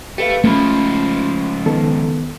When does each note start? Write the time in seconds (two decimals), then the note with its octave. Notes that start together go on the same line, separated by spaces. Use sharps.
0.18 A3 G4 B4 F5
0.44 C#2 F3 A3 C#4 B5
1.66 D#3 B3 A4